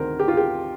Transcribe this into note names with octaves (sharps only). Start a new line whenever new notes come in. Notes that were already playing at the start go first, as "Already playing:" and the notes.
Already playing: D2 C3 D#3 A#4 C5
G4
F4
G4